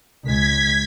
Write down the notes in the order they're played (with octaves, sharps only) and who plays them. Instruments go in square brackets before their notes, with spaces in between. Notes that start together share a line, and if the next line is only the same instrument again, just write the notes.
[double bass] C#2 G#3 [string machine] G#6 B6